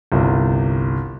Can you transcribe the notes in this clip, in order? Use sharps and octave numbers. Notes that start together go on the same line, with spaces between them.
G1 C2